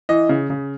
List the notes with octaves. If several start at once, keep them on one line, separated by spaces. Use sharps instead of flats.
E3 D#5
C#3
C#3